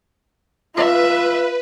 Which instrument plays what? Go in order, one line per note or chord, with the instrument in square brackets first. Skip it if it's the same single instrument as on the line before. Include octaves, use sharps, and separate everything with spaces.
[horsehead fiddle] F4 E5 [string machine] B4